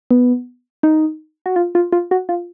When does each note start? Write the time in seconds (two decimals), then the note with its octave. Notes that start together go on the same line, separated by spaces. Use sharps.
0.11 B3
0.83 D#4
1.46 F#4
1.56 F4
1.75 F4
1.92 F4
2.11 F#4
2.29 F4